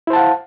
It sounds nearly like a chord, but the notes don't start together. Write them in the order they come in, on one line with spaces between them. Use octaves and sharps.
E4 C5 A5 F#5 F5